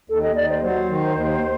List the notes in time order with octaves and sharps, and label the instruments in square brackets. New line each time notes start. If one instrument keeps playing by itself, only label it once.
[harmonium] D#2 [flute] A4
[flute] D#5
[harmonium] D#2 [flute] D5
[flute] C5
[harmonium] F#3 [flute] C5
[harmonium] D#3
D#2